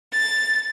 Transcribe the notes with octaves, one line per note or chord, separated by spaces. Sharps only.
A6